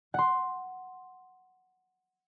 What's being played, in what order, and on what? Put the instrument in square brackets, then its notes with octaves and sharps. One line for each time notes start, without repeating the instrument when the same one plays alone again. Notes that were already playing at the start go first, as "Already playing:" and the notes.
[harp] F#5 C6